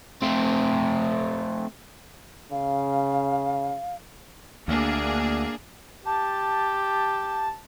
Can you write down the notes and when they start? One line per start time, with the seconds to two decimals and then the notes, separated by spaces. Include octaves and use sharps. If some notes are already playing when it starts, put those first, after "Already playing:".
0.22 A3 C4
2.51 C#3 F5
4.68 D2 A#3 D4 G#4
6.05 G4 A5